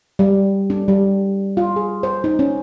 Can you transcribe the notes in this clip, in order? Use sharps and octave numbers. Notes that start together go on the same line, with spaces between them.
G3
D4
G3
F4
G#4
C5
D#4
C#4